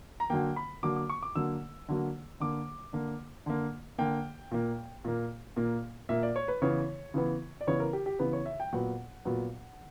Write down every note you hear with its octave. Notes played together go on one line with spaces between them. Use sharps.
A#5
D3 F#3 A#3 G5
B5
D3 F#3 A#3 D6
D6
C#6
D6
D3 F#3 A#3 E6
D3 F#3 A#3
D3 A#3 D6
D3 A#3
D3 A#3
D3 A#3 G5
A#2 A#3
A#2 A#3
A#2 A#3
A#2 A#3 E5
D5
C#5
B4
C#3 E3 B3 C#5
C#3 E3 B3
D5
C#3 E3 B3 C#5
A#4
G4
G4
C#3 E3 B3 B4
C#5
E5
G5
A#2 F#3 B3 F#5
A#2 F#3 B3